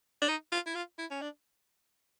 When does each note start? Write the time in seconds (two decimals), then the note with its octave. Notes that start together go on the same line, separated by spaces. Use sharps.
0.22 D4
0.29 D#4
0.52 F4
0.67 E4
0.75 F4
0.98 E4
1.11 C#4
1.21 D4